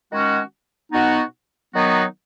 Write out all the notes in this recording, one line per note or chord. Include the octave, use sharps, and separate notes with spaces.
D#3 G#3 C#4 F#4
B2 B3 D#4 F#4
D#3 F#3 B3 D#4 F#4